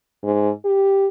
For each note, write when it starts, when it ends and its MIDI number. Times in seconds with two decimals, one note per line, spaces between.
0.23 0.50 44
0.65 1.07 67